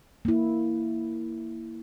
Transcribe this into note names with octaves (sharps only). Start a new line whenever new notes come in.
A#3 E4